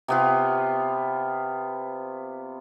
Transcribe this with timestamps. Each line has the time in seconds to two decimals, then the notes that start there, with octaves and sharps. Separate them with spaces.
0.08 C3 B3 F4